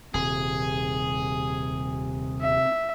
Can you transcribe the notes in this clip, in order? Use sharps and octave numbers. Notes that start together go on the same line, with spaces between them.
D#1 C3 G#4
E5